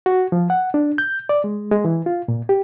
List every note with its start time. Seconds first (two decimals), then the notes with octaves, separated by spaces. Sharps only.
0.06 F#4
0.32 F3
0.50 F#5
0.74 D4
0.98 G6
1.29 D5
1.44 G#3
1.71 G#3
1.85 E3
2.06 F4
2.28 A#2
2.49 G4